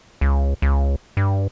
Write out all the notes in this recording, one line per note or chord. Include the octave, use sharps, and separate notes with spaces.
C#2
C#2
G2